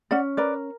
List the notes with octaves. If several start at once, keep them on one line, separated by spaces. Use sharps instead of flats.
C#4 D5 F#5
A#4 B4 D5